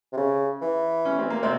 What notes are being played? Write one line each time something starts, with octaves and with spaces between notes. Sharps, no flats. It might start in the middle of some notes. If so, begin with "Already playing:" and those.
C3
C#3
E3
C#4
C4
A#3
C3 C4